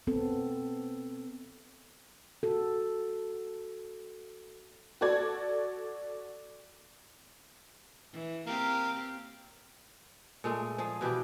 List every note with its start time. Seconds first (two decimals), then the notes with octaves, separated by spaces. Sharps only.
0.07 B3 C4 A4
2.43 F#4 A4
5.01 F#4 A4 D5 G#6
8.13 E3
8.46 A#3 C4 G4 A#4 F5
10.44 A#2 G#3 A3
10.78 F3 G#4
11.01 B2 E3 G3 G4